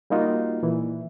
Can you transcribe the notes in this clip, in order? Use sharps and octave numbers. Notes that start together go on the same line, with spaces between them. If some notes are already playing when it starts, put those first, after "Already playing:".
G3 A#3 D#4 F4 F#4
A#2 E3